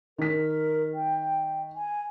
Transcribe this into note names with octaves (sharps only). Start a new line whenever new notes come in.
D#3 A#4 B6
G5
G#5